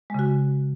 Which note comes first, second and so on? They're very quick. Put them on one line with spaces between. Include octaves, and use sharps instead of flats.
G#3 C#3 F#4